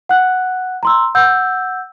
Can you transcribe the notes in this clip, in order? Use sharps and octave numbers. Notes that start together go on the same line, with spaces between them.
F#5 F#6
A#5 C6 E6
F#5 E6 G6